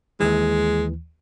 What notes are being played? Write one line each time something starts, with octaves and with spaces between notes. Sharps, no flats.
D#2 E3 G#3